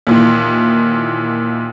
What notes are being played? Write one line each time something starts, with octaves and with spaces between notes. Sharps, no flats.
D#2 A#2 E3